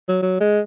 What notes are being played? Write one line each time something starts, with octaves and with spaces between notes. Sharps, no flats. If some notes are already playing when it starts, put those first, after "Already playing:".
F#3
F#3
G#3